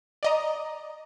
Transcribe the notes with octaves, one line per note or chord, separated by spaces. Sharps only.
D5 D#5 A#5